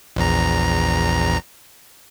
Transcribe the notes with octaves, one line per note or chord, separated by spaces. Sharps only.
A#1 E2 A#5